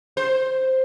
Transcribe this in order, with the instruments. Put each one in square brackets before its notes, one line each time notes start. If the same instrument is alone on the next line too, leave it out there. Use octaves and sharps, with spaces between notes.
[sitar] C5